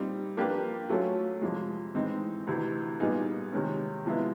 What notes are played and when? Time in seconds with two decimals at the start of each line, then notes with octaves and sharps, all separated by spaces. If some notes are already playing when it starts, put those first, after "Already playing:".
Already playing: A#2 G3 C4 D#4
0.37 F3 A#3 D4 G4 B4
0.89 F#3 A3 C#4 F4
1.41 F2 C3 F3 G#3
1.95 A2 E3 G#3 C4 D#4
2.47 D2 C3 E3
3.00 A#2 G3 B3 D#4 G#4
3.52 C3 D#3 G#3 C#4
4.05 C3 F3 G#3 B3 E4